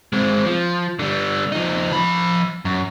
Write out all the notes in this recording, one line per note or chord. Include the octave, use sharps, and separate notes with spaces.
G#3 C4
F3
D3 G3
F3 D#4
F3 B5
F#2